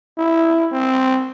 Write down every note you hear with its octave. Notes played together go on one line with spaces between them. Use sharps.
E4
C4